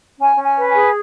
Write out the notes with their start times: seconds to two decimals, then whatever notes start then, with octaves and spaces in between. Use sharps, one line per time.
0.19 C#4 G#5
0.37 C#4
0.44 G#5
0.56 B4
0.69 G#5
0.75 G#4